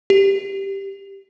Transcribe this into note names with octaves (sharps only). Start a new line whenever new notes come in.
G4